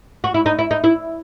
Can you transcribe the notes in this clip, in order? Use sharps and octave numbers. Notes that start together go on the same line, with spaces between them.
F#4
E4
D#4
E4
D#4
E4